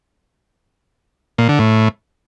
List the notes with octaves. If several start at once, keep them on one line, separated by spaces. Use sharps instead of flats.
A#2
D3
A2